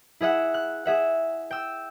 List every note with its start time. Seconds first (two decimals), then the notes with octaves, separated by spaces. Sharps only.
0.21 E4 G#4 E5 F#5
0.54 F#6
0.86 G#4 E5 F#5
1.51 G5 E6